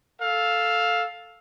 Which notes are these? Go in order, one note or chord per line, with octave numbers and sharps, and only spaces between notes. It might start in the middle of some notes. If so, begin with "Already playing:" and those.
A4 F5